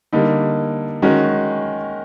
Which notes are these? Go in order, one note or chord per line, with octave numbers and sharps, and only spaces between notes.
D3 G3 A#3 D#4
D#3 G#3 C#4 F#4 A#4